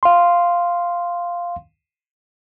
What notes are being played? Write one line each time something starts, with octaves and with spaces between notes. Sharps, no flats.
F5 C6